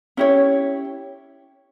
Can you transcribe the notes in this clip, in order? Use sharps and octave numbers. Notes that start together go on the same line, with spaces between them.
C#4 E4 G4 C#5